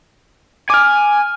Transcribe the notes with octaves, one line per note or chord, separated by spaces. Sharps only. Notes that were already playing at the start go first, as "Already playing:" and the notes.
G#5 D6 F6